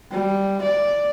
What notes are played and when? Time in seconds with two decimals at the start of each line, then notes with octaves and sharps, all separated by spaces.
0.11 G3
0.61 D5